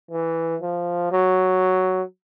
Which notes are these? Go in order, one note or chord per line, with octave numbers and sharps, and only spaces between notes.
E3
F3
F#3